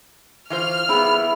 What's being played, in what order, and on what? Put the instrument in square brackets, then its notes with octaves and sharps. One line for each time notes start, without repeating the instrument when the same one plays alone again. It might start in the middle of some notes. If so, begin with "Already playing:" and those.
[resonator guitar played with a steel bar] E3 F4 C5 [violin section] F6
[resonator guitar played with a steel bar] G3 A#3 B3 [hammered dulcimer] E4 [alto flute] G#4